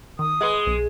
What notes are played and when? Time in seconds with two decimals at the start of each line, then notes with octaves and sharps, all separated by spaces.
0.19 D#3 D#6
0.41 G#3 B4 F#5 A6
0.67 B1